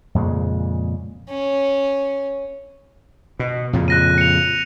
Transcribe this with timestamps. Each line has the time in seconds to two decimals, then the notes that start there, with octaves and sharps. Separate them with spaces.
0.15 F2 A#2 C#3 G#3
1.29 C#4
3.39 B2
3.73 F2 A#2 C#3
3.88 F#6 A#6 D#7
4.18 C#7 F7